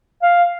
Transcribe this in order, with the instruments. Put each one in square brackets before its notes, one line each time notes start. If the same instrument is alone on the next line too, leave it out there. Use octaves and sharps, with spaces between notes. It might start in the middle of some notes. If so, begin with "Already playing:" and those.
[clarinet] F5